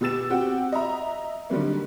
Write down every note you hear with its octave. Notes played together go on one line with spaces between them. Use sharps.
B2 G4 E6 A6 E7
C4 F#4 G4 F#5 G5
D#5 E5 A#5
D3 D#3 F#3 G3 A#3